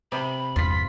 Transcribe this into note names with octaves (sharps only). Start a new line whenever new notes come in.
C3 B5
E2 G2 F4 B6